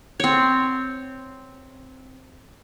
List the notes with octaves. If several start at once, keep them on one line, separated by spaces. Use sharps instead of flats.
C4 C#5